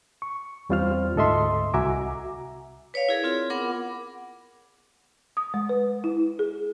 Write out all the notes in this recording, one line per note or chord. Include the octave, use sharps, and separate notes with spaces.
C#6
E2 G3 C4 F4 C5 F6
D2 G#2 A4 D#5 E5 C6
C2 F#4 E5 G#5 A#5 D6
B4 C#5 D5 F5
E4 G#4 A#4
C4 F4 G#4
B3 A#4 F#5 B5 D6
D#6
G#3
B4
E4
G#4